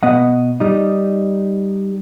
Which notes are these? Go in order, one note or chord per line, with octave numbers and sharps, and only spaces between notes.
B2 B3 D#5 F#5
G3 D#4